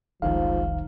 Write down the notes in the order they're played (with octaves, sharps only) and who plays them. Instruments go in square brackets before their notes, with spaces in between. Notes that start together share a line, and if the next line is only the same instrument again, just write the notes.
[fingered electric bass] F1 C2 D#3 [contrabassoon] G#2 [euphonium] F3 [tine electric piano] F5